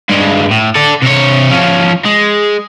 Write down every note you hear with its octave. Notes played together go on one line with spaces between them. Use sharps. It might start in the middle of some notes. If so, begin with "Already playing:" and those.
G2 G#3
A2
A4 D5
C3 C#5
F3 C#4
G#3